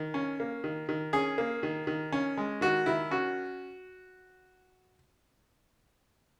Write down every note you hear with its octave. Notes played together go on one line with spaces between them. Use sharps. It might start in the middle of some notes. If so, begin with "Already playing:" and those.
Already playing: D#3
C#4
A#3
D#3
D#3
C#4 G#4
A#3
D#3
D#3
C#4
G#3
D#3 F#4
D#3 E4
C#4 F#4